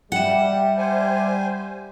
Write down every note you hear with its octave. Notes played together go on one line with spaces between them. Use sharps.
G3 E5 F#5 G5
C5 G#5